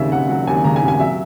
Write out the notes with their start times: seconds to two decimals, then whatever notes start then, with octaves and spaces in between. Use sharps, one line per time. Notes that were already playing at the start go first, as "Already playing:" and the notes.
Already playing: D#2 C#3 F#3 E5
0.12 D#2 F#5
0.29 F#3 F#5
0.47 D#2 G#5
0.64 C#3 A#5
0.76 G#5
0.82 D#2
0.88 G#5
1.00 F#3 E5